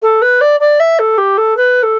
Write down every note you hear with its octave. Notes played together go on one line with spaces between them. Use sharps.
A4
B4
D5
D5
E5
A4
G4
A4
B4
A4